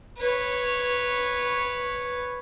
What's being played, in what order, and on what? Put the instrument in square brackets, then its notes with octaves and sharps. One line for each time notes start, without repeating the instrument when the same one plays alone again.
[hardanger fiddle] B4 C#5